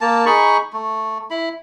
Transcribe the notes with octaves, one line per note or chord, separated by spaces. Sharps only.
A#3 A5
D#4 G#4 B5 C#6
A3
E4 B5